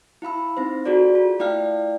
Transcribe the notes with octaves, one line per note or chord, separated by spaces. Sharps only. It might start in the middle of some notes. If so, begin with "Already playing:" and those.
E4 F5 B5 E6
C4 D#4 C5
F4 F#4 G#4 A4 D5
F4
A3 E4 D5 F5 G5 F6